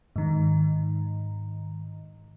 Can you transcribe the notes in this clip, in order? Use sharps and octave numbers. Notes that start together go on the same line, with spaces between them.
G#2 D#3